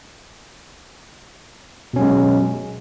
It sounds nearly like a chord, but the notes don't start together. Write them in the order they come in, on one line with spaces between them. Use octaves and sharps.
B2 C#4 F#3 G#3